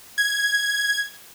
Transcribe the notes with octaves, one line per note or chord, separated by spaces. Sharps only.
G#6